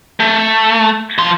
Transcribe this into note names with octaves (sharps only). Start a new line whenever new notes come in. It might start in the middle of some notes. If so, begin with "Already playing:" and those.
A3
F3 C6